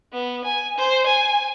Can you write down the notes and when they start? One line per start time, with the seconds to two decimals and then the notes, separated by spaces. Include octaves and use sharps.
0.12 B3
0.44 G#5
0.77 C5
1.06 G#5